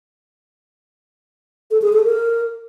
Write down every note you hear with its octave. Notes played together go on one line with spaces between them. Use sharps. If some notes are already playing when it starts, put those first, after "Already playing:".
A4
G#4
A4
A#4